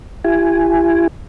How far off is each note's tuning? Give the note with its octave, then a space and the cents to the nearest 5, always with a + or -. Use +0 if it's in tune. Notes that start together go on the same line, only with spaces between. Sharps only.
E4 +35 G4 +0 G#5 +0